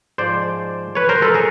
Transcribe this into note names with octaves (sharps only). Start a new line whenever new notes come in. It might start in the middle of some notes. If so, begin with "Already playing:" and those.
G#2 F3 G#3 C5 D5
B4 C#5
A#4 C5
A4 B4
G#4 A#4